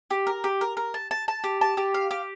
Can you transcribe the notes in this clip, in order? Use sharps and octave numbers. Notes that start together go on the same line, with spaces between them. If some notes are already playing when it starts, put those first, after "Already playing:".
G4
A#4
G4
A#4
A#4
A5
A5
A5
G4
A5
G4
F5
G4